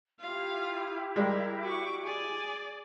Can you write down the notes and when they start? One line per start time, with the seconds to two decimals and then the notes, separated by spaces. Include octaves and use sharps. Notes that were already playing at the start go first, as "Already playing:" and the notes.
0.20 E4 F4 G4 F5
1.16 G3 G#3 A#4
1.63 F#4 C#6 D6
2.04 G#4 D5 G#5